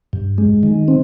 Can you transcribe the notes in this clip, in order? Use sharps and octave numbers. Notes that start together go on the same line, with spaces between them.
G2
G#3
D#3
C4